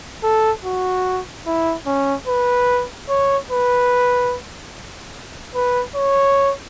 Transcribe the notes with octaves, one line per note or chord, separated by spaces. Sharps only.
A4
F#4
E4
C#4
B4
C#5
B4
B4
C#5